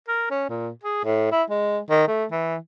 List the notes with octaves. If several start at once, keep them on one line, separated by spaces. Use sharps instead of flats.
A#4
C#4
A#2
G#4
A2
E4
G#3
D#3
A3
E3